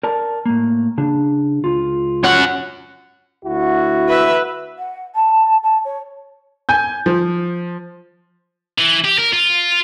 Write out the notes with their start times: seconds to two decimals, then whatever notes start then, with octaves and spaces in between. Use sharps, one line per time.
0.03 A#4 D5 A5
0.46 A2 A#3
0.98 C#3 D4
1.64 C#2 F4
2.24 C#4 F#5
3.45 D2 E4 F#4
4.09 B4 E5
4.79 F#5
5.15 A5
5.63 A5
5.85 C#5
6.69 G#5 G6
7.06 F3
8.78 E3
9.05 G4
9.19 A#4
9.33 F4